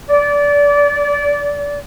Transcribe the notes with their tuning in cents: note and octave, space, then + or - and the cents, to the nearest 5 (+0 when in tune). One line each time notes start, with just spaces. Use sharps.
D5 -25